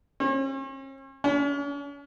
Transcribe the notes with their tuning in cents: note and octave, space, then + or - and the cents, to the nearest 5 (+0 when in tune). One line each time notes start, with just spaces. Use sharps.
C#4 -45
C#4 +40